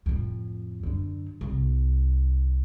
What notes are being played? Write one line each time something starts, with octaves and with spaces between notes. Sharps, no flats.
F2 A2
F#2 D3
C2